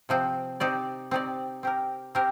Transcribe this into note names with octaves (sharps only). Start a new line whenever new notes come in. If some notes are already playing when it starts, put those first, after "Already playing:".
C3 F3 C4
C4 D#4 G4 D5
C4 D#4 G4 D5
C4 G4 A#4
C4 G4 A#4